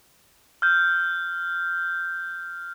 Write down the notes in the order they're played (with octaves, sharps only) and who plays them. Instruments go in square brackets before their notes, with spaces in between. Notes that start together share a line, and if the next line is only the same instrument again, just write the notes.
[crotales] F6 G6